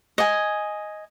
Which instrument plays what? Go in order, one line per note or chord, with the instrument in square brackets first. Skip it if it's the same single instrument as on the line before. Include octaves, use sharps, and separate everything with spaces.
[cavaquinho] D#5 G#5